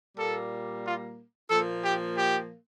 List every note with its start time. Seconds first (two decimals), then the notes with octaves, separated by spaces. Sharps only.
0.16 A#2 G3 A#3 A4
0.83 F4
1.49 A#2 F3 A#3 A4
1.83 G4
2.16 G4